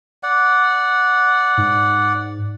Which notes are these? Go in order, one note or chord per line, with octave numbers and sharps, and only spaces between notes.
D5 F#5
G#2